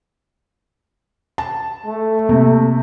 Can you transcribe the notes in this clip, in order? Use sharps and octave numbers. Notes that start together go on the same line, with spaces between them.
A5
A3
C3 A#3